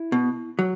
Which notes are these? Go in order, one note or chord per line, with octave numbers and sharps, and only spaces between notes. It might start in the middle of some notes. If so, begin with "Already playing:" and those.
Already playing: E4
B2
F#3